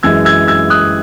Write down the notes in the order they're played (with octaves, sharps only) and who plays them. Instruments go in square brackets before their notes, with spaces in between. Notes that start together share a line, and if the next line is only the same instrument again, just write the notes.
[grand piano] F#2 E3 G#3 E6 G#6
E6 G#6
E6 G#6
D#6 F#6